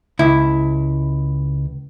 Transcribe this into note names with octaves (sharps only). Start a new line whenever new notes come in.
C#2 E4